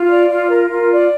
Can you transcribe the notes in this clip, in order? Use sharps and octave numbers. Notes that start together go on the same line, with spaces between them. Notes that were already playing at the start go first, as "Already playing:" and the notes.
Already playing: F4
D5
F4
A#4
F4
D5